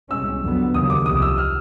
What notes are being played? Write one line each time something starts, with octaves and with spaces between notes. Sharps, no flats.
C2 B2 G#3 C#4 E6
F2 D3 F#3 B3
D#2 C#3 F#3 A#3 D#6
D6
C2 C3 F3 D#6
E6
F6